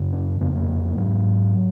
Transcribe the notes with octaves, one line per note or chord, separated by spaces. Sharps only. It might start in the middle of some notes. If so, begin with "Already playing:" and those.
Already playing: F#2 C#3
C#4
F2 C#3 B3
A#3
G#2 F#3